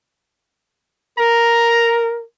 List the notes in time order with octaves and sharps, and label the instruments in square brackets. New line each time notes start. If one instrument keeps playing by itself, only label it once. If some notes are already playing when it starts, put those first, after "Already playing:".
[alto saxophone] A#4 [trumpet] A#5